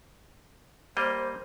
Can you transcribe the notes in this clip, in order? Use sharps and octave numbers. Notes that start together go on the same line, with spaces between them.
G3 A#3 C5 D#5